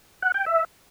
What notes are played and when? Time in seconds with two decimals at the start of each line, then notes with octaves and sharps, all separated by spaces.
0.22 F#5
0.34 G5
0.46 E5